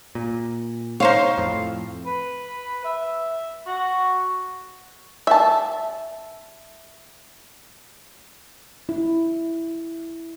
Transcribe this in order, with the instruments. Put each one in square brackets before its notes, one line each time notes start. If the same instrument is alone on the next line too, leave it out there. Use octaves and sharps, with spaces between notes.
[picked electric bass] A#2
[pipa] D#4 C5 C#5 [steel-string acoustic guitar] F5
[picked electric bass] F2 A2
[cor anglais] B4
E5
F#4
[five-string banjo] E5 A5
[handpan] E4